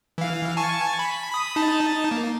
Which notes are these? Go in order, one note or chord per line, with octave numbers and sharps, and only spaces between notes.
E3 F5
G#5 A5 C#6
B5
B5 D#6
D#4 A5
A#3